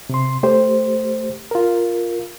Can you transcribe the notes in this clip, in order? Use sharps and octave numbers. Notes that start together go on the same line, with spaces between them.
C3 C6
A3 G4 C5
F4 A#4